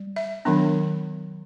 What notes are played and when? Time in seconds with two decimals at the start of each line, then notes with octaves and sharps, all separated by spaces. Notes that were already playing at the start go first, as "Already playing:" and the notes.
Already playing: G3
0.16 E5
0.45 D#3 F#3 B3 D4